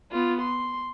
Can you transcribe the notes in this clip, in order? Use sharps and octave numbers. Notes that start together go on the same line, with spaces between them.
B3 F4
C6